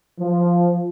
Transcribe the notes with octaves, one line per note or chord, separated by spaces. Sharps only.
F3